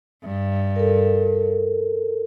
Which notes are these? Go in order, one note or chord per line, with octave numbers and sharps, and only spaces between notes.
G2
A4 A#4